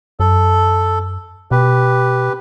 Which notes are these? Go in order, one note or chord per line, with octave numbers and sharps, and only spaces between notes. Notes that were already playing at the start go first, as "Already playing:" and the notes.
F#2 A4
B2 G4 B4